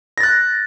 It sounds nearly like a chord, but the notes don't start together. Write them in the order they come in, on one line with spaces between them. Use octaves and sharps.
A#6 A6 F#6